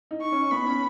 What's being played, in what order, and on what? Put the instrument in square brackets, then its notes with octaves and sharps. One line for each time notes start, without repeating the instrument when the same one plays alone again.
[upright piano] D#4
[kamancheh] C#6
[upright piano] C#4
[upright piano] B3 [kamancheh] B5
[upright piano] C#4